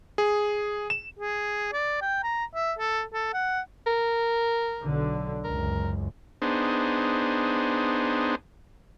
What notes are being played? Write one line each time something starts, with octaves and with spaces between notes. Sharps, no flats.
G#4
E7
G#4
D5
G5
A#5
E5
A4
A4
F#5
A#4
B1 D3
F#1 C#2 F#2 A#4
B3 D4 D#4 G#4 C5